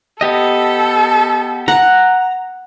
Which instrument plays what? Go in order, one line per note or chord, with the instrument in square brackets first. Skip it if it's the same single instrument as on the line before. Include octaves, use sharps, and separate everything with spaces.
[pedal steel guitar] B3 G4 D#5 [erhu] A4
[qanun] F#5 [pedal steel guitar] A#5